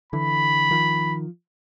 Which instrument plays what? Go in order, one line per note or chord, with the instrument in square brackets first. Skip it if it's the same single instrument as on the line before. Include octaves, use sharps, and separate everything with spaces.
[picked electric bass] D3 E3 [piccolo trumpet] B5
[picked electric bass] D#3 F3